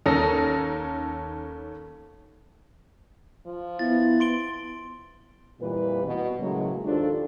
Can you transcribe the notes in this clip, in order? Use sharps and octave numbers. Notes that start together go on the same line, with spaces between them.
D#2 C#4 A4 A#4 D#6 A#6
F3
B3 E4 A6
C6 D7 G7
F2 A#2 E3 G3 B4
B2 B3
A2 C#3 F#3 G#3 A#3
D#2 D4 F4 G4 A4 C5